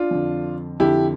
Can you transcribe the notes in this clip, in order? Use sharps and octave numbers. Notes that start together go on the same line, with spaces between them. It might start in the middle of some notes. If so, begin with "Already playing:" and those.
Already playing: D4 F4
F2 D3
F2 D3 E4 G4